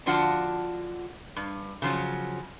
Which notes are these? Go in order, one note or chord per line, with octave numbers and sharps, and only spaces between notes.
D3 F3 D4 F4 F#4 F#5
G2
C#3 F3 F#3